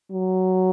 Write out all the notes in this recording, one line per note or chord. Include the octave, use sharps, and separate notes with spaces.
F#3